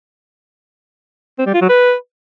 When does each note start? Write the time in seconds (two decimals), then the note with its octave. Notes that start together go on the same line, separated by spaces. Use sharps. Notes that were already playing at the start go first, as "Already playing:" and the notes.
1.39 C4
1.46 G3
1.54 F4
1.61 F#3
1.69 B4